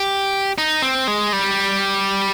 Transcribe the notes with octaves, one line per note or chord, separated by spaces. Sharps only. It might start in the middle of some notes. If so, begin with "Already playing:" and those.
Already playing: G4
D#4
C4
G#3
G3